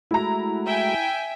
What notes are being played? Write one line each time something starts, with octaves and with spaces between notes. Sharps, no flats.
G#3 A3 E4 F#4 A#5
E5 G5 G#5